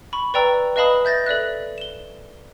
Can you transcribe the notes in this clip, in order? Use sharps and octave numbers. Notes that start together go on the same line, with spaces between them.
B5 C#6
B4 D5 G5 A#5 E6
B4 D#5 F5 A5 B5 D#6
E5 G6 A6 A#6
A4 D5 E5 F#6
E7 G7